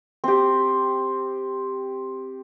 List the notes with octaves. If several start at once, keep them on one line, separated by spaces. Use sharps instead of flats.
C4 G4